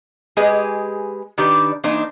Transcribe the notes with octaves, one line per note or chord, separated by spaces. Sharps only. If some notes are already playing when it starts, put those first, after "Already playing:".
G#3 G4 G#4 B4 D#5
D#3 D4 G4 B4 D5
E3 A#3 D4 D#4 C5